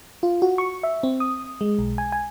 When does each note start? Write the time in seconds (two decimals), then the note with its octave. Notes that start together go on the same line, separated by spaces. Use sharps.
0.23 F4
0.42 F#4
0.58 C#6
0.83 E5
1.03 C4
1.20 D#6
1.61 G#3
1.79 B1
1.98 G#5
2.12 G#5